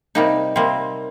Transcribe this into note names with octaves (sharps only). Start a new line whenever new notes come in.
C3 G3 A#3 D#4
C3 G3 A#3 C4